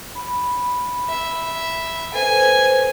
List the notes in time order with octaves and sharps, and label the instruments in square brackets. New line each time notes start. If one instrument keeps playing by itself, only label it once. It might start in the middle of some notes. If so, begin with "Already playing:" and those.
[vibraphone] B5
[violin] E5
[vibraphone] A4 B4 C5 [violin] G#5